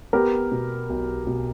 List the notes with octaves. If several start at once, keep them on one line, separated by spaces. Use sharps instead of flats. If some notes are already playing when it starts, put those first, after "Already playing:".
B3 G4 A#4
B2
B1
B2